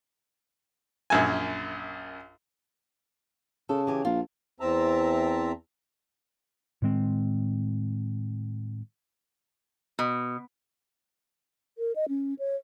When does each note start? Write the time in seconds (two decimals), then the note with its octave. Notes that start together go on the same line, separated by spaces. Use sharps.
1.10 A#1 F#2 G#5
3.69 C#3 A4
3.87 E3 G4 G#5
4.05 A#1 F4
4.60 E2 C4 E5 A5 A#5
6.82 A2 D#3 G#3 C4
9.99 B2
11.78 A#4
11.96 D#5
12.09 C#4
12.39 C#5